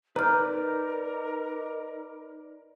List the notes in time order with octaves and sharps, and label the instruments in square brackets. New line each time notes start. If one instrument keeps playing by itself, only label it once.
[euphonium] D#4 [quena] A#4 [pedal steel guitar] B4 D5 G6 [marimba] A#5 F6